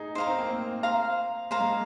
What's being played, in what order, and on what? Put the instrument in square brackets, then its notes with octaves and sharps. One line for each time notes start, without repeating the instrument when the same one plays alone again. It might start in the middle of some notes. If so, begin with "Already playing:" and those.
Already playing: [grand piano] D#4 G#4
[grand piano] D#4 [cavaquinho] C5 F5 A#5
[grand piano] C4
A#3
C4
[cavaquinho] C5 F5 A#5
[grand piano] A#3 [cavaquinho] C5 F5 A#5
[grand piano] G#3
A#3